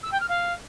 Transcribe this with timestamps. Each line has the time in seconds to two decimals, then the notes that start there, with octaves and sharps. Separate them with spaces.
0.03 E6
0.11 G5
0.20 F6
0.28 F5